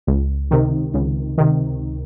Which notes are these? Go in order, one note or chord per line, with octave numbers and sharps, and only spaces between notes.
C#2
C3 D#3
C#2
C3 D#3